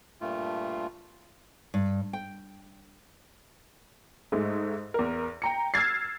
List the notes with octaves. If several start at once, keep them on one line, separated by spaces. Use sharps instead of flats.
G2 A#2 A3 F4
G2
G5
G#2 G#3 A3
E2 A#4
G5 A#5 C#7
E6 F6 G#6 A6 C7